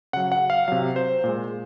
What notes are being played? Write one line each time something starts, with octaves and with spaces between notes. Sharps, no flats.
C#3 F#3 F#5
F#5
F5
C3 F#3 F5
C5
A#2 G#3